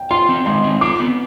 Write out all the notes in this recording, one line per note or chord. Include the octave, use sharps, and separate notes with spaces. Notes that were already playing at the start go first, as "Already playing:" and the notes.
Already playing: G5
F4 C6
C4
G#3 C6
C4
F4 D6
B3